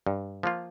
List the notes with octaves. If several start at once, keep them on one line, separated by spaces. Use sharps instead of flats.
G2
F3 A#3 F4